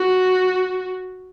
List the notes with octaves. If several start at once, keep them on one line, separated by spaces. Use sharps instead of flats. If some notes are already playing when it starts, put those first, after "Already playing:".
Already playing: F#4